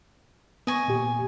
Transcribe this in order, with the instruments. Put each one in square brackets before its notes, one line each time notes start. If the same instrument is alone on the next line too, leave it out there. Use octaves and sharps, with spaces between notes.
[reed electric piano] B3 [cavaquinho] D#5 G#5 C#6
[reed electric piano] A#2 G4